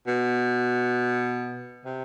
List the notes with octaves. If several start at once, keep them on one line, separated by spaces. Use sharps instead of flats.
B2
C3